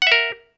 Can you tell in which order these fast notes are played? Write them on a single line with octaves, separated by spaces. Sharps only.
F#5 E5 A#4